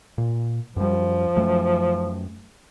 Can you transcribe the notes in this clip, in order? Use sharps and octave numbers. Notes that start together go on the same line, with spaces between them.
A#2
F#2 F3 G3
F#2 F#3 A3